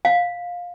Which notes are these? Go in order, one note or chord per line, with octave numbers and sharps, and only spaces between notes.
F5